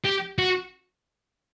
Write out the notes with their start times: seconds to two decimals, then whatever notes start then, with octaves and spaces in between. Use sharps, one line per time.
0.04 G4
0.39 F#4